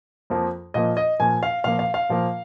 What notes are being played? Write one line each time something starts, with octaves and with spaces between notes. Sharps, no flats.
F2 F3 A#3
A#2 F3 A#3 D#5
D#5
A#2 F3 A#3 G#5
F5
A#2 F3 A#3 F5
F5
F5
A#2 F3 A#3